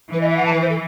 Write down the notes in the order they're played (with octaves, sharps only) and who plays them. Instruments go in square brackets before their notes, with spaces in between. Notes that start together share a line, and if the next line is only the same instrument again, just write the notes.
[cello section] E3 [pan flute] B4
[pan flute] D#5
E5
F#5
A5
B4
C5
A4